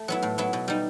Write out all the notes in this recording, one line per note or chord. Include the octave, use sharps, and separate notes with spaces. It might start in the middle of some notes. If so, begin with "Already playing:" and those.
Already playing: A3
F#3 B3 E4
A2
F#3 B3 E4
B2
G3 D#4